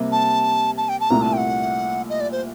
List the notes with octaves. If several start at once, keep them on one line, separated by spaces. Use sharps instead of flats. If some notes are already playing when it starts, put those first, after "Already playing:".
Already playing: C3 G3 A#3
A5
A5
G5
A5
C2 A#2 A3 A#5
A5
G5
F#5
D#5
D5
C5